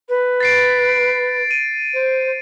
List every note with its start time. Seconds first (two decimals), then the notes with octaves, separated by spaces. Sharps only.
0.09 B4
0.40 A6 C7 D7
1.51 D#7
1.94 C5